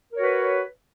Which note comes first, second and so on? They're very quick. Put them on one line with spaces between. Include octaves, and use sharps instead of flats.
A#4 C#5 F#4 B4